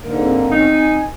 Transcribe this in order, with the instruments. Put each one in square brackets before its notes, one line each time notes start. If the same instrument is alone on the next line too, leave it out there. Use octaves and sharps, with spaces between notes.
[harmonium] G#2 D3 A#3 [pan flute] A#4
[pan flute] C4
[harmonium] E2 B2 C#4 [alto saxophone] D#4
[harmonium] G#5